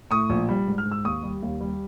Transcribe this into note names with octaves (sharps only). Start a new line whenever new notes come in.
A2 C#6 D#6
A#1
G3
G#2
F6
G#2
E6
D#2 C#6 D#6
G3
D#2
G3